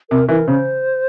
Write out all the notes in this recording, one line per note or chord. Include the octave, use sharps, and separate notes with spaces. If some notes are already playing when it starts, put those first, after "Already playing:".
C3 A#4
E3 A#4
C#3 C5